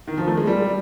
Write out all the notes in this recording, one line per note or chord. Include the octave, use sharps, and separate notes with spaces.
D#3
F3
A3
G#3
G3